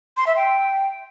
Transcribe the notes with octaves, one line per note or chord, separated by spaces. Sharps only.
C6
E5
G5